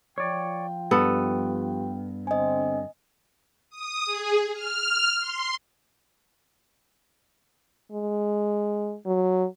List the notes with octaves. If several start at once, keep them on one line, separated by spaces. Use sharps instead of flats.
F3 F4 C#5 D5 G5
G2 B3 G4 A4
D3 C4 D#5 G#5
D#6
G#4
F6
C6
G#3
F#3